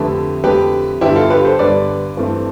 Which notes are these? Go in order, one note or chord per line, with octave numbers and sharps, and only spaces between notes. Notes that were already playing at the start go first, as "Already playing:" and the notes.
Already playing: F2 D3 A3 G4 B4
F2 D3 A3 G4 B4
G2 D3 G3 B3 E4 G4
F4 A4
G4 B4
A4 C5
G2 D3 G3 B3 B4 D5
G2 E3 A3 C4